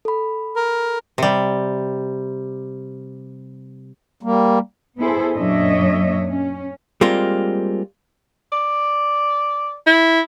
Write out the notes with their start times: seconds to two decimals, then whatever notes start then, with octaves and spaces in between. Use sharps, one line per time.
0.05 A4 B5
0.56 A#4
1.18 C3 G3
4.23 G3 A#3
4.99 B3 E4 G#4 A4 C5
5.36 F#2 A#2 D4 C#5 D#5 E5
6.27 C#4
7.01 G3 G#3 A#3 C4 F4
8.52 D5
9.87 E4